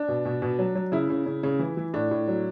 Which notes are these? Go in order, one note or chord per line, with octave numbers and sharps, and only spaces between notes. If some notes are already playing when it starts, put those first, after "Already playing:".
Already playing: D4
B2
B2
B2
F#3
F#3
C#3 E4
C#3
C#3
C#3
E3
E3
A2 D4
A2
F#3